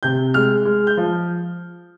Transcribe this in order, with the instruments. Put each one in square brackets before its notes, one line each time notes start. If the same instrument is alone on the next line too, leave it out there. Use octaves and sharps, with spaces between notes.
[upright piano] C3 G6
G#3 F6
G#3
G6
F3